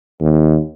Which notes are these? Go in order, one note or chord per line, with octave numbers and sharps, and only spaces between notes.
D#2